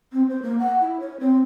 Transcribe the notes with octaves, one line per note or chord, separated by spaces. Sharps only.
C4
C5
A#3
F#5
E4
C#5
C4